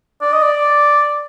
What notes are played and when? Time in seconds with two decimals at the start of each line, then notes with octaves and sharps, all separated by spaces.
0.22 D5
0.32 D#5
0.42 D5